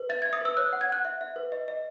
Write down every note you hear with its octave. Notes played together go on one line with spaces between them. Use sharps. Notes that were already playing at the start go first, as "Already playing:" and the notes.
Already playing: B4
E5 A6
E5 G#6
D#6
B4 E6
C#5 F#6
F#5
G#6
F#5 F#6
E5
E5
B4
D#5
D#5